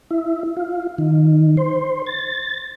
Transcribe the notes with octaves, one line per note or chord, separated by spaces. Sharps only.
E4
F4
D#3
C5
A6